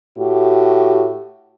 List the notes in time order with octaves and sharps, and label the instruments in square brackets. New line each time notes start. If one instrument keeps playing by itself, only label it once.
[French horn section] A2 F#4 G4